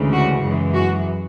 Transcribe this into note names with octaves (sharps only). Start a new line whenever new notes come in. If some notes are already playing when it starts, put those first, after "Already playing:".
Already playing: D2 C#3 E3 G#3
F#4
F#2 E3 G#3
F#4